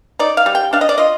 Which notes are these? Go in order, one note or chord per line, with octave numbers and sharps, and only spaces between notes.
D#4 D5
F5
G3
G5
D4 F5
D#5
D5
F4 D#5